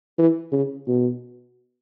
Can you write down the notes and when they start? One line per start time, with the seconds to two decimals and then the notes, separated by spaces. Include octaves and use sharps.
0.18 E3
0.52 C#3
0.88 B2